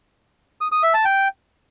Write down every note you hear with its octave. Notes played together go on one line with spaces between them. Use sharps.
D#6
D#6
E5
A5
G5